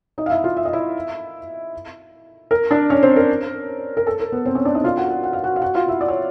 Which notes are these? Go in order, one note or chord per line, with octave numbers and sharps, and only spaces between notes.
D#4 D#5
F5
E4 E5
F4 F5
E5
D#5
E4 E5
A#4
D4 D5
C#4 C#5
C4 C5
A#4
A#4
A4
A#4
B3 B4
C4 C5
C#4 C#5
D4 D5
D#4 D#5
F4 F5
F#4 F#5
F#4 F#5
F#5
F5
F#4 F#5
F5
F#4 F#5
F4 F5
E4 E5
D5
C#5